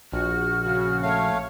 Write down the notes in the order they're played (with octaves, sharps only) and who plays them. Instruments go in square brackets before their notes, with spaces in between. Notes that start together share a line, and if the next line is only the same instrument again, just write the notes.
[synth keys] A#1 [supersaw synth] F#4 [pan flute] F6
[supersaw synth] C#3 F#4
[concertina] A3 F5 [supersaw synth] C#5